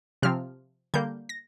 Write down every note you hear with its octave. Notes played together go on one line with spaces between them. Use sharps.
C3 F3 C4 F6
D3 G3 A#3 G6
A#6